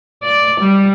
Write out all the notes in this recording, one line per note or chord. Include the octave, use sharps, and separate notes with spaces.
D5
G3